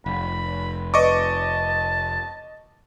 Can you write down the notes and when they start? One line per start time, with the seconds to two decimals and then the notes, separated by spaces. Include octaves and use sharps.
0.06 F1 B5
0.94 B4 D5 D#5 A5 C#6 D6